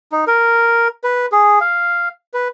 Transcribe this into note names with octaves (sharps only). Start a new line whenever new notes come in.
D#4
A#4
B4
G#4
F5
B4